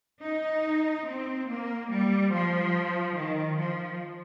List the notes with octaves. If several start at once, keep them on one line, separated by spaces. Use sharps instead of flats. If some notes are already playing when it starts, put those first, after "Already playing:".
D#4
C4
A#3
G3
F3
D#3
F3